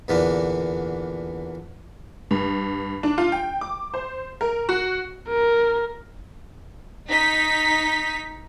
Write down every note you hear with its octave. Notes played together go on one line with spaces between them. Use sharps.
E2 A#2 D3 E3 B3 D4
G2
D4
F4
G5
D6
C5
A#4
F#4
A#4
D#4 B6